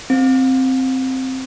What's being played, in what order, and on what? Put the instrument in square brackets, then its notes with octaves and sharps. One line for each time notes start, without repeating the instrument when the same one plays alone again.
[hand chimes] C4